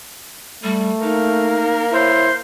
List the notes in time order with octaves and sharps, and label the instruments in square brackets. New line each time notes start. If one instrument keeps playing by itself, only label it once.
[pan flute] G3 [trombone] A3
[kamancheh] A#3 A#4 [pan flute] D#4
[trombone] E4 [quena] C5 [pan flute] C#5